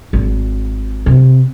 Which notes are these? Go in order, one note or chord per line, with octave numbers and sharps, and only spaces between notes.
G#1
C3